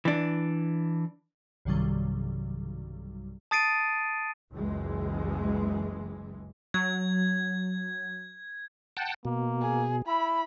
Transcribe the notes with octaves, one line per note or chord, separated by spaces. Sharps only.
E3 D4
B1 G2 C3 D#3 F#3 G3
A5 D#6 A6 C7 D7 D#7
F#1 C#2 E3 G#3
F#3 G#6
F#5 G5 A5
B2 A#3
G#4
E4 B5